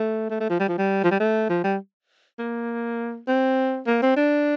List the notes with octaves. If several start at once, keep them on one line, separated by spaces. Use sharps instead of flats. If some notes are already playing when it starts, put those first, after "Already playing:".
Already playing: A3
A3
A3
F3
G3
F3
G3
F3
G3
A3
F3
G3
A#3
C4
A#3
C4
D4